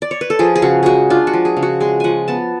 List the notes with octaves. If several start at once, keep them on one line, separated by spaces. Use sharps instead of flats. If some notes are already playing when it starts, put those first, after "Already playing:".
D5
C#5
B4
A4
F3 G#4
G#4
C#3 F#4
G#3 F#4 G#4
D4 F4
F#4
F3
G#4
C#3
F#4
G#3 G#4
F3 F#5 G#5
B3 A5